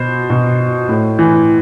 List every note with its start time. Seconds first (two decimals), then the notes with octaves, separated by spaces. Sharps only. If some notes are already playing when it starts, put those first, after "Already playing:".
Already playing: B2 C5
0.30 B2
0.89 A2
1.19 E3